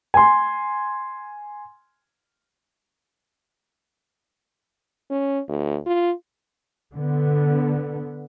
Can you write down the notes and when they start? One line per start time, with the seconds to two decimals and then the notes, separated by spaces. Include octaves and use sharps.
0.14 G#5 C6
5.10 C#4
5.49 D2
5.86 F4
6.96 D3 B3